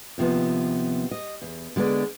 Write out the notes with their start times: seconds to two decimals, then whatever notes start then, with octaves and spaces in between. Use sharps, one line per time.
0.18 D#2 C3 F3 B3
1.11 D#5
1.42 E2
1.76 D3 G#3 B3 D5